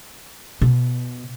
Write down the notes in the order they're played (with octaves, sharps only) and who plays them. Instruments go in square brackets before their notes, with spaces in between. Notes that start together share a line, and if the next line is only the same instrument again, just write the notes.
[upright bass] B2